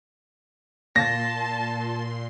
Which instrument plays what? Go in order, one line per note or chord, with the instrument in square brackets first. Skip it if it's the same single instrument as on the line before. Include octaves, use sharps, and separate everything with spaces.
[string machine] A#2 C6 [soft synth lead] A#3 [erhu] A5 [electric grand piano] A#6